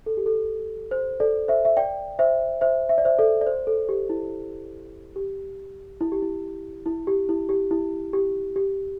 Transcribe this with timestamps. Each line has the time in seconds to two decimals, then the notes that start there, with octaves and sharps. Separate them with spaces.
0.06 A4
0.17 G4
0.26 A4
0.91 C5
1.20 A4 D5
1.48 C5 E5
1.65 E5
1.77 D5 G5
2.19 C5 E5
2.61 C5 E5
2.89 E5
2.98 D5
3.05 C5 E5
3.19 A4 D5
3.41 D5
3.47 C5
3.67 A4
3.89 G4
4.09 E4
5.16 G4
6.01 E4
6.12 G4
6.22 E4
6.86 E4
7.07 G4
7.29 E4
7.49 G4
7.71 E4
8.13 G4
8.56 G4